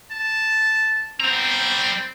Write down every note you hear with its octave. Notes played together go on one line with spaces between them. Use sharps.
A5
G3 C4 A#5